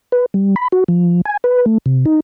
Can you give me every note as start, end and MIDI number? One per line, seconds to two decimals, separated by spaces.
0.12 0.26 71
0.34 0.55 55
0.56 0.68 83
0.72 0.84 66
0.88 1.21 53
1.25 1.37 80
1.44 1.65 71
1.66 1.78 57
1.86 2.05 48
2.06 2.20 63